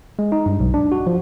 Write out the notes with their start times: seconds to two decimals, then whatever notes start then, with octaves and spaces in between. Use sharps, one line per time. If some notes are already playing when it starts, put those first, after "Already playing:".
0.19 G#3
0.32 D#4
0.46 G2
0.60 B1
0.74 D4
0.92 F#4
1.07 F3